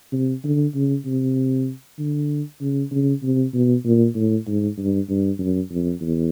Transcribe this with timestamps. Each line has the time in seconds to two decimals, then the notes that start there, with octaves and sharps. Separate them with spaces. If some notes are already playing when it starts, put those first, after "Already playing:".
0.12 C3
0.44 D3
0.74 C#3
1.06 C3
1.99 D3
2.61 C#3
2.91 C#3
3.23 C3
3.54 B2
3.85 A#2
4.15 A2
4.47 G#2
4.78 G2
5.09 G2
5.39 F#2
5.71 F2
6.01 E2